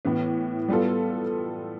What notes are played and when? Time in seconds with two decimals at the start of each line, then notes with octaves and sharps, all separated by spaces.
0.05 A2 E3 B3
0.68 G3 B3 F4 A4